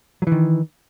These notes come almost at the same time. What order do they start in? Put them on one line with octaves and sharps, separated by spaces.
F#3 E3 D#3